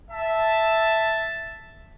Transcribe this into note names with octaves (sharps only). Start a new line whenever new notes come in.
E5 A5